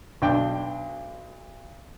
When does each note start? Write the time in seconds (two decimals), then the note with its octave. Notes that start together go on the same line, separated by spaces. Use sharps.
0.22 B1 D4 G5